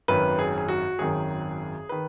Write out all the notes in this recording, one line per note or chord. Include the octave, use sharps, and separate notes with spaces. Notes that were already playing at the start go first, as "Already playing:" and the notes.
G#1 F#2 D#3 B4
G#4
G#4
F#4
G#1 F#2 D#3 G#4
D#3 B4